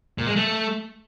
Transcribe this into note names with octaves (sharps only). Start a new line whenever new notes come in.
A#2
G#3
A3